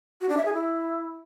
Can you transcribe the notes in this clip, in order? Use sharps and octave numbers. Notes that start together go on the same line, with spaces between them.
F#4
D4
E5
G#4
E4